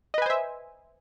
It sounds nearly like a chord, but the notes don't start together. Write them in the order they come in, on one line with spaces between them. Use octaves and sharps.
D#5 B4 G#5 C5 E5